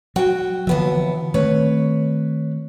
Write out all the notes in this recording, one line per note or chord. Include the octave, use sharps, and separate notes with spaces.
F#3 F#4 G5
D#2 D3 E3 F3 B3 E5
D#3 A3 C4 B4 C#5